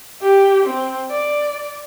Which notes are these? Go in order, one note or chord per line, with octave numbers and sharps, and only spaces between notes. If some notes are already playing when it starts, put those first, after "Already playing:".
G4
C4
D5